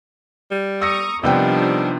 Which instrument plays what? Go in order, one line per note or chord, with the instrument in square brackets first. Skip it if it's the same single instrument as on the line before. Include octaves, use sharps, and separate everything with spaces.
[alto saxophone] G3
[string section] A#5 C#6 D#6 [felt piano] E6 A#6 C#7
[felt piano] C3 B3 G5 [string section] D#3 F3 D4 [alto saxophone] G3